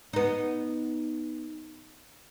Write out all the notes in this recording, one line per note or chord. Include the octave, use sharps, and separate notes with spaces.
B3 D#4